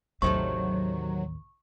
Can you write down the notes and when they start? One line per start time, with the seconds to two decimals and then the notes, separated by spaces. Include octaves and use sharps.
0.22 A1 D#2 C3 D#3 F#3 A3 C#6